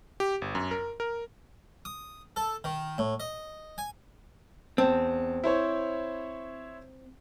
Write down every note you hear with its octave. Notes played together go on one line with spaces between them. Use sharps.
G4
G1
F#2
A#4
A#4
D#6
A4
D#3
A2
D#5
G#5
E2 C4 A5
E4 C5 C#5